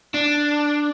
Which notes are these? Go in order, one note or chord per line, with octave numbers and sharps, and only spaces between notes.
D4